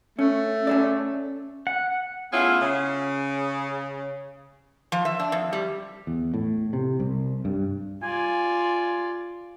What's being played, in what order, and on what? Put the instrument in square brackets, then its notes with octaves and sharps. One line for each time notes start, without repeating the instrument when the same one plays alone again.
[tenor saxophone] A3 [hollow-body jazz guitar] C#4
[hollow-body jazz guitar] C#4 A4 D5
[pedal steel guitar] F#5
[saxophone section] A3 B3 C#4 E4 F4 G#4
C#3
[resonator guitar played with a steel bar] F3
E5
D4
F2
G3
[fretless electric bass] E2
A2
C3
C2
G2
[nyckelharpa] F4 D5 [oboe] G#5